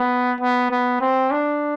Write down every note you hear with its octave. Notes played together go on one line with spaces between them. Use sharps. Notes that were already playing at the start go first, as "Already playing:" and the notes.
Already playing: B3
B3
B3
C4
D4